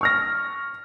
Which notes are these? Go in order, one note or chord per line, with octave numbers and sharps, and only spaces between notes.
C#6 F6 A#6